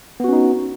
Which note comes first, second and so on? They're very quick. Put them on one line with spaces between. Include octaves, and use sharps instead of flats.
B3 F#4 C#4 D#4